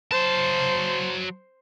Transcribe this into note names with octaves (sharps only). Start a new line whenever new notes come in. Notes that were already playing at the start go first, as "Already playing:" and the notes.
F#3 C5 A5